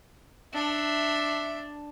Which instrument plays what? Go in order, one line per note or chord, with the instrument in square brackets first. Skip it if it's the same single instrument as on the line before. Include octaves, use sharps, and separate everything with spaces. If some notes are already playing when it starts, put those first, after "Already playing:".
[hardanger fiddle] D4 [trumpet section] E5